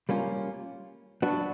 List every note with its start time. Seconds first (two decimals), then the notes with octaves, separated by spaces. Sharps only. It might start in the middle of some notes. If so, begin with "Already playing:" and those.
0.09 G3 A#3 C#4 F4
1.22 F#3 B3 D4 F#4